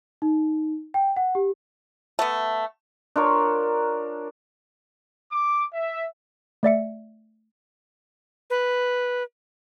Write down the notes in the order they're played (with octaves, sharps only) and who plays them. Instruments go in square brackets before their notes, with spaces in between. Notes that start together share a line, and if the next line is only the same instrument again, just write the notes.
[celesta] D#4
G5
F#5
G4
[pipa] A3 B3
[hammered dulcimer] D4 F4 A#4 C#5
[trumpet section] D6
E5
[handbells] A3 D5 E5 C#7
[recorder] B4